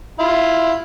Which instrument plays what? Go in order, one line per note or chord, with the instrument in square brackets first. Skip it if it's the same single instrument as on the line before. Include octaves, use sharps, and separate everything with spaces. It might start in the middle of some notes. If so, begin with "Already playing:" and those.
[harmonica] E4 F4